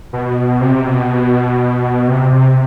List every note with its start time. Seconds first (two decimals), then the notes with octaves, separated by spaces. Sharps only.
0.13 B2
0.61 C3
0.87 B2
2.08 C3
2.32 C3